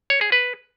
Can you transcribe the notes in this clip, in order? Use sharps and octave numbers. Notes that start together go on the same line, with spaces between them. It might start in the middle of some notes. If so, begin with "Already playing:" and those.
C#5
G#4
B4